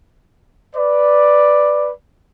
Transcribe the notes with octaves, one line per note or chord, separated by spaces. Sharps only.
B4 D5